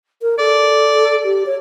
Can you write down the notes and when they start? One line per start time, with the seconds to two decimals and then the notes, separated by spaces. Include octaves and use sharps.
0.21 A#4
0.39 A4 D5
1.24 G4
1.46 C#5